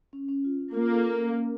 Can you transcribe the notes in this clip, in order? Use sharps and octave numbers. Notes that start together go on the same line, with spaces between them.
C#4
C#4
F4
C#4
A#3 F4
A4
C#4
C#4
A#4